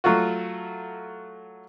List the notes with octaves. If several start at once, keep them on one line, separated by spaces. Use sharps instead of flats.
F#3 A3 F4 F#4